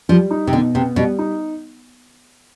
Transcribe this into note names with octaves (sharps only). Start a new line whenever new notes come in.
F3 G3
D#4
C3
B2 D3
C3 B3
B2 G3
D#4